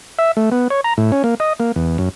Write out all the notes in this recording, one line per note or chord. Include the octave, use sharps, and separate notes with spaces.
E5
A3
B3
C#5
A#5
A2
C#4
A#3
D#5
A#3
E2
F#2